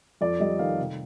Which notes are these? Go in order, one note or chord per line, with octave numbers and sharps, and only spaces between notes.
F2 D5
G3 D#5
D#3 F5
F1